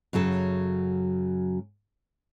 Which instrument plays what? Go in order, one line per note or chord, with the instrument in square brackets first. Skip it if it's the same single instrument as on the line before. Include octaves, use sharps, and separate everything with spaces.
[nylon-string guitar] F#2 C#3 F#3 A4